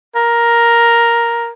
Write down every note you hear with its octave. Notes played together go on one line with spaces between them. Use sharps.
A#4